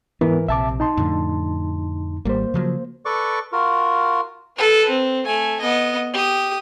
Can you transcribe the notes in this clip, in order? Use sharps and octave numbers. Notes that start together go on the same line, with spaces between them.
G#2 E3 B3 A#4
A#1 C3 E5 A5 D6
D#4 A5 C6
F2 A2 D3
G#1 G3 A#3 C5
C#3 F3 F#3
A4 B4 D5 C#6 D6
F4 F#4 A#4
A4 B4
C4
A3 G#5
B3 D#5
G4 D#6